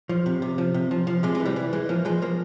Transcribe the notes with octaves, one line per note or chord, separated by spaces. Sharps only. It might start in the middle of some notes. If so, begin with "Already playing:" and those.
F3
C3
C3
F3
C3
F3
F3
C3 G#3
G#3
E3
G3
E3
E3 G#3
F3 A#3
F3 G#3
F3 A#3